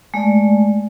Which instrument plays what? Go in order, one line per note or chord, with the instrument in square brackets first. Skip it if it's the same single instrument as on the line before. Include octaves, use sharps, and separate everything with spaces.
[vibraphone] G#3 A3 D5